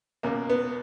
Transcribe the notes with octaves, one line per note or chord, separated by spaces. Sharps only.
C#2 B2 A#3
B3